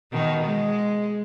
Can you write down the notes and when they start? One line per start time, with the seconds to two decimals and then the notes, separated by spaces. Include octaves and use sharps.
0.12 B2 D#3
0.43 G#3